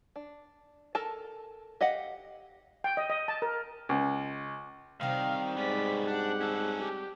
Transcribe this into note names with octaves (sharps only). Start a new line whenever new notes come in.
D4
A4 A#4 A5
G4 D#5 F5 F#5
G5
D#5
D#5
A5
A#4
C#2
C3 D#3 G3 F5
G#2 B3 C#4 D5 B6
D4 G4 F#5
C#4 A4
G4